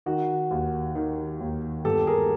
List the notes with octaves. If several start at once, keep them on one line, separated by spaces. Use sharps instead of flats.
D#3 F#4
D#2
D#3
D#2
G1 G4 A4
G#4 A#4